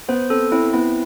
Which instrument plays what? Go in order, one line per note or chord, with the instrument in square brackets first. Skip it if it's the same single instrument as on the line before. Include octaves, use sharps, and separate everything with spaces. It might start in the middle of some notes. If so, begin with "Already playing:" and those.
[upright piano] B3 [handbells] C5
[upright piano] C4 [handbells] A4
[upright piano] C4 [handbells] E4
[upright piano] B3 [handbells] E4